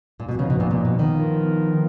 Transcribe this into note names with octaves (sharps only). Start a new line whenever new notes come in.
A#2
B2 F3 B3 D#4
C#3
B2
A#2
A#2
B2
D#3
F3 B3 F4 A#4